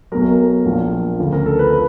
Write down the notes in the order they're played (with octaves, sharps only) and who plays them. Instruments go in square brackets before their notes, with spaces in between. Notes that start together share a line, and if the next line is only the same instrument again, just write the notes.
[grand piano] B1 B2 F#3 A#4
A#1 A#2 F3
D2 C#3 F3
A#4
A4
B4
B4